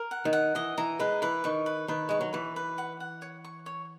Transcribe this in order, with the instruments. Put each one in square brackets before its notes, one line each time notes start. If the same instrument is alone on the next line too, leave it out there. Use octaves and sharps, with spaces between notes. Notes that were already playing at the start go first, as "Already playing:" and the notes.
Already playing: [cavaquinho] A#4
F#5
[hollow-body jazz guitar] D#3
[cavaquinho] F#5
[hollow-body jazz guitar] E3 [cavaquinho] D#5
[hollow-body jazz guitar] E3 [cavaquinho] A#5
[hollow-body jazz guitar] G#3 [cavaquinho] B4
[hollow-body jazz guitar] E3 [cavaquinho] B4
[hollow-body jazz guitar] D#3 [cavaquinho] C#6
[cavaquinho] B4
[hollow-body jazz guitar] D#3 [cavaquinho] B4
[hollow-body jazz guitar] G#3 [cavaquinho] C#6
[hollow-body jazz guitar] F#3
[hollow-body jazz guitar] E3 [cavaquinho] B4
[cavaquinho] B4
F#5
F#5
C#5
C#6
C#5